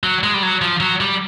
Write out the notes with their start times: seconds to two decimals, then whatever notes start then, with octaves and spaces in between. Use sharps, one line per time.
0.03 F#3
0.24 G#3
0.34 G3
0.43 F#3
0.61 F3
0.80 F#3
1.01 G3